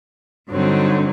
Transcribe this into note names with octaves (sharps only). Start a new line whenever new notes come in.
G2 D3 F#3 C4 D#4